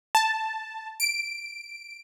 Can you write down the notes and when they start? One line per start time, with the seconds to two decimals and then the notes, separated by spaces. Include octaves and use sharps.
0.15 A5
1.00 D7